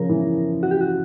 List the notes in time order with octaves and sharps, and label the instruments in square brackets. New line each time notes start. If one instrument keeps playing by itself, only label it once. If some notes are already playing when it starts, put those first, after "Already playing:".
Already playing: [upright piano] C#3 F3 [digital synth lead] A#4
[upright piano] E3
[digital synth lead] F#4
G4
F#4